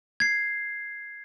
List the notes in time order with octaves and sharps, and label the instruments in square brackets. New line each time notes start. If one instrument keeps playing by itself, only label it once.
[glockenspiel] G#6 C7